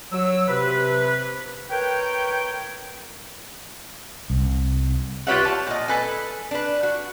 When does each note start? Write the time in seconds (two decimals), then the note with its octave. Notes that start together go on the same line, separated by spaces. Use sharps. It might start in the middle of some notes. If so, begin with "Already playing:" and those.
0.12 F#3 E6
0.48 C3 B4
1.70 A#4 B4 C#5 G5
4.30 C2
5.27 F4 G4 B4 C#5 E5 F#5
5.45 A5
5.67 A#2 D#5
5.88 A4 B4 G#5
6.51 D4 B4
6.83 F#4